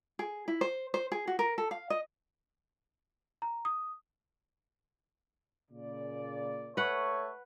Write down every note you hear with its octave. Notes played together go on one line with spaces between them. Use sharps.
G#4
E4
C5
C5
G#4
F#4
A#4
A4
F5
D#5
A#5
D#6
A#2 C#3 D5
A3 B4 C#5 F#5